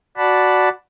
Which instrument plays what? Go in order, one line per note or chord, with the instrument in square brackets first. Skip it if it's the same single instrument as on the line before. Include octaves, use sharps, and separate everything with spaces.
[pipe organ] F#4 D5 F#5 A5 B5